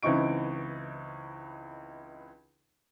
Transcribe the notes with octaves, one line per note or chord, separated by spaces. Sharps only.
C#2 E3 C4 D#4 C#6 D7